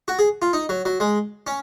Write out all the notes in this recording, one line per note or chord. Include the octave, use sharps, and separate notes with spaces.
F#4
G#4
F4
D#4
F#3
F#3
G#3
C#4